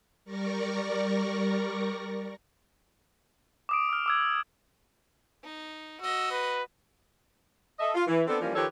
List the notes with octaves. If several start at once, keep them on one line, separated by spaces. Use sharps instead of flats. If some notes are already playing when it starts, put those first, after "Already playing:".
G3 A#4 D5 C#6 A#6
D6 D#6 D7
E6 F6
D6 E6 G#6
D#4
F#4 D#5 E6
B4
A4 D#5 E5
F4
E3
B3 C4 D4 A4
E3 F3 G3 A#3 C#4
D#3 F3 G4 A4 B4 C#5